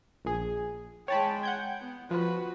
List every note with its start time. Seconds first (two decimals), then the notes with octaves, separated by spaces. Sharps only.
0.25 A#1 G#4
1.08 G#3 C#5 G5 A5 B5
1.43 F#5 G6 G#6
1.80 B3
2.11 F3 F#4 B4